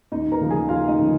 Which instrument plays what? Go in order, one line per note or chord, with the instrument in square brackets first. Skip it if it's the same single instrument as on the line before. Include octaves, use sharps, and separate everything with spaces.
[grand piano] D#2 D#4 D#5
A#4 A#5
C#3 F3
G#4 G#5
D#2 F4 F5
D#4 D#5
C#3 F3